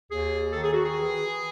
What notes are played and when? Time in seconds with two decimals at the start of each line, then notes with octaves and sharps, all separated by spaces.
0.11 D#2 G#4
0.53 D#3 A4
0.63 G#4
0.74 F#4
0.85 G#4
0.94 E3